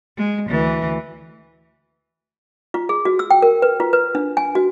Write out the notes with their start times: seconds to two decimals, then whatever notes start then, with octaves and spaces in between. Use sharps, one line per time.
0.17 G#3
0.47 D2 E3
2.74 F4
2.89 G#4
3.05 F#4
3.19 E6
3.31 G5
3.42 A#4
3.62 B4
3.80 F4
3.93 B4
4.15 D4
4.37 G#5
4.55 F#4